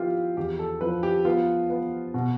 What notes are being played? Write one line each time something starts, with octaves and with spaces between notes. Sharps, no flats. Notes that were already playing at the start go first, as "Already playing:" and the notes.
Already playing: F3 B3 E4 F4 G4
E2 G4
A4
F3 B4
G4
B3 F4
B3
B2